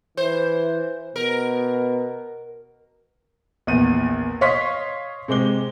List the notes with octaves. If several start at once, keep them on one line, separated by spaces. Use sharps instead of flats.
E3 C5
B2 A#4
A#1 E2 D#7
C#5 D#5 F5 C6 C#6 B6
C3 G#3 C5 D6 G7